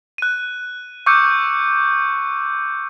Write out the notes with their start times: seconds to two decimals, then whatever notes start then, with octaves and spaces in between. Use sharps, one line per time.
0.18 F#6 D#7
1.06 C#6 D6 E6 F#6 G6 C#7